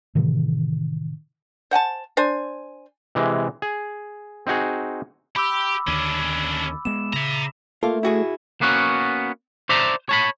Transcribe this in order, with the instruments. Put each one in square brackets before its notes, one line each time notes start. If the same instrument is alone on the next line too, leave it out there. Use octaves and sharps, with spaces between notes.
[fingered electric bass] A2 C3 D#3 E3
[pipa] C5 F#5 G#5 A5
D4 C5 G#5
[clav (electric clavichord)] C3 E3 G#3
G#4
C4 D#4 F#4 G#4
[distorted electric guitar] G4 [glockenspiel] B5 D6 E6
[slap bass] D#2 D3 [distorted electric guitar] C#4 D4
[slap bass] G#3 B3 [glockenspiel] E7
[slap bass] C#3 [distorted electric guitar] E5 A#5
[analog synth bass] A3 [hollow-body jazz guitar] A#3 F4
[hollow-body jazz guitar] E4 F#4 G#4
[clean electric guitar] A#3 B3 C#4 F#4
C5 D5 E5 A5 A#5
C#5 A5 B5